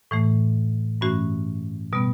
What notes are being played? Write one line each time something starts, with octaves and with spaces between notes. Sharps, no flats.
A2 E3 A3
G2 E3 A3 C#4 F#4
B2 G3 B3